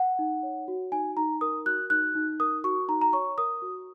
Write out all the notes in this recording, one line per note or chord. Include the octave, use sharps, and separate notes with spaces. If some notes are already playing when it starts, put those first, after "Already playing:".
Already playing: F#5
D#4
C#5
F#4
D#4 G#5
D#4 A#5
A#4 D#6
F#4 F#6
D#4 F#6
D#4
A#4 D#6
F#4 C#6
D#4 A#5
A#5
C#5 C#6
A#4 D#6
F#4